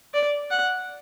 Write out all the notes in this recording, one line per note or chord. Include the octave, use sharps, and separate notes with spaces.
D5
F#5